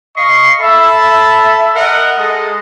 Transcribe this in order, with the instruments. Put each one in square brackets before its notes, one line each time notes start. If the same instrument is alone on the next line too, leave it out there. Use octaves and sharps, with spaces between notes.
[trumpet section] D#5 F5 C#6 [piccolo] C7
[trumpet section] A4 A5 B5 [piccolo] E5
[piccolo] E5
[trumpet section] A#4 D#5 F#5
G#3 A4 D#5